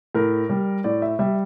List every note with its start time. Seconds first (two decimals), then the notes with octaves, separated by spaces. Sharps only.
0.15 A2 A#4
0.49 G3
0.84 A2 D5
1.02 E5
1.19 G3 E5